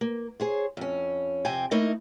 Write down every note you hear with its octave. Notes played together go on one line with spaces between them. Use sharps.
A#3
G#4 C5 C#5
F2 C#4
F2 C3 C5 G5 G#5
A3 A#3 D#4 E4 A#4 D#5